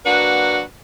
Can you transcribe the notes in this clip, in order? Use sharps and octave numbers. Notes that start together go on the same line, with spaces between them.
F#3 A#3 D4 F#4 B4 F#5